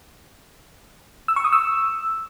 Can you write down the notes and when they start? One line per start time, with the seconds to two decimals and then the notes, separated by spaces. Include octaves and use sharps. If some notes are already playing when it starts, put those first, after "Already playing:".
1.28 E6
1.36 C#6
1.44 D#6
1.53 E6